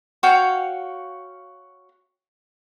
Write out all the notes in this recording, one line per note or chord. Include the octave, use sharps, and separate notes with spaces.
F#4 C#5 F5 G5